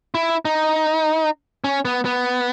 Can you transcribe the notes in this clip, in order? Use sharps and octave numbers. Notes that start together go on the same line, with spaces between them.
E4
D#4
C#4
B3
B3